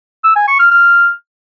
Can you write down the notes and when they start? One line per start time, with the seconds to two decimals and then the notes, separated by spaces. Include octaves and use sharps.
0.24 E6
0.36 G#5
0.48 C#6
0.60 F6
0.71 F6